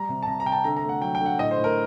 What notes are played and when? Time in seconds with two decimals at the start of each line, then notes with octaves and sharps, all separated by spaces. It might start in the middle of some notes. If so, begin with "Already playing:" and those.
Already playing: G3 A#5
0.09 C3
0.23 A5
0.27 C3 A#5
0.40 A#5
0.45 C3 G5
0.52 A5
0.64 D3 A#5
0.77 A#5
0.84 A3
0.89 F#5
1.01 F#3 G5
1.15 G5
1.21 D3
1.26 F#5
1.39 A2 D#5
1.51 C5
1.57 A2
1.64 A#4